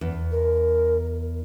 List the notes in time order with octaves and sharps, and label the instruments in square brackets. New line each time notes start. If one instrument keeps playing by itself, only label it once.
[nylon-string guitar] E2
[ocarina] A#4